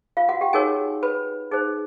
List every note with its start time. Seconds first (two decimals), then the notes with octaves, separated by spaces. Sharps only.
0.17 F4 F5
0.29 F#4 F#5
0.41 G4 G5
0.53 D#4 F#4 G#4 A#4 C#5 G#5
1.03 B4 B5
1.51 D#4 G#4 C5